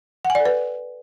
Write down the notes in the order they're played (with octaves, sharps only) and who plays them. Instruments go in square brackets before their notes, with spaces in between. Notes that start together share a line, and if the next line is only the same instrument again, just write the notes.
[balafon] F#5
G#5
D5
A4
B4